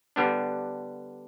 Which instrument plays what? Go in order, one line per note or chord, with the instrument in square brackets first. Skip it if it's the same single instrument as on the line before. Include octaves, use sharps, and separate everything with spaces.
[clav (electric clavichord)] D3 G3 B3 D4